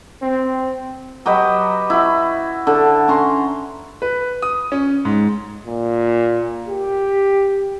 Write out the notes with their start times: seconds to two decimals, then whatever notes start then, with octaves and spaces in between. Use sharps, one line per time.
0.23 C4
1.26 F#3 G4 B4 D#5
1.90 E4 F#4
2.67 D3 A4
3.08 C#4 A#5 C6
4.02 B4
4.42 D#6
4.72 C#4
5.05 G#2
5.67 A#2
6.68 G4